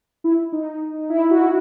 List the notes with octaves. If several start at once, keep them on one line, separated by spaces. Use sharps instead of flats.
E4
D#4
E4
F#4